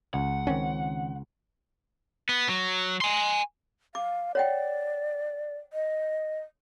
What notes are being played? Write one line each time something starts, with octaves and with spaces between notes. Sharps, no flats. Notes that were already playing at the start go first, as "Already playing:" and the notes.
C#2 F#5
D#3 C4 C#4
B3
F#3
G#5 C6
F5 D6
C#5 D5 F#5 G5
D#5